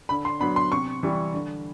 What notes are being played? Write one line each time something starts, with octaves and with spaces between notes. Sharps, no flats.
D3 B5
C6
F#3 B3 D4 B5
C6
C3 C#6
E3 G3
D3